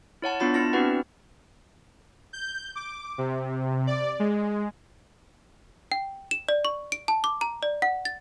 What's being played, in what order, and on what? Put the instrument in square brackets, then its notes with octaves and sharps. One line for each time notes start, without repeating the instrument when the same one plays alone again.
[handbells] E4 C#5 F#5 A5
B3 D4 F4 B5 A6
B3 E4 A5 A#6
C4 D4 E4 F#4 B4 F#5
[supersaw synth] G6
D6
C3
D5
G#3
[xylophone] G5
E7
D5
C#6
D7
A5
D6
A#5
D5
F#5
A6